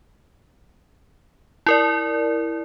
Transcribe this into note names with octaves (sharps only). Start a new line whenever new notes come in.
E4 A#4 D5